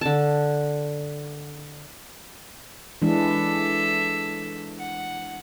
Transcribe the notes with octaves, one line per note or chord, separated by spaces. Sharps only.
D3 A5
E3 G#3 D4 A4 E5
F#5